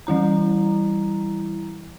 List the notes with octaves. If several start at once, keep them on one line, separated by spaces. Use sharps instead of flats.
E3 G3 E4 A#5